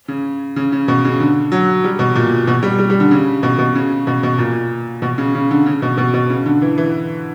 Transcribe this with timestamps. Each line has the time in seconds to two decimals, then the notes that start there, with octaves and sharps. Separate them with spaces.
0.08 C#3
0.56 C#3
0.72 C#3
0.88 B2
1.04 C#3
1.20 D3
1.52 F#3
1.84 G3
1.99 B2
2.16 A#2
2.47 B2
2.63 G3
2.79 G3
2.90 G3
3.00 D3
3.11 C#3
3.43 B2
3.59 B2
3.75 C#3
4.07 B2
4.23 B2
4.38 A#2
5.02 B2
5.18 C#3
5.35 C#3
5.51 D3
5.66 C#3
5.82 B2
5.97 B2
6.14 B2
6.30 C#3
6.46 D3
6.62 E3
6.78 E3